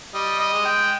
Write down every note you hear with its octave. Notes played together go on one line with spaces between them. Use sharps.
G3 D#5
D#5
G#3
G5